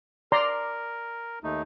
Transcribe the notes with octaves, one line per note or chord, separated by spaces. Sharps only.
A#4 D5 A#5 C6
D#2 A3 D#4